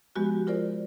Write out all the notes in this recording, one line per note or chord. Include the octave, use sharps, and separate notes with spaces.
F3 G#3 B3 F#4 G4
F4 A#4 C5 D5